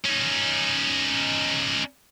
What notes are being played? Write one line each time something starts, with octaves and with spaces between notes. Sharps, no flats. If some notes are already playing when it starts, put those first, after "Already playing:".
C#4 D#4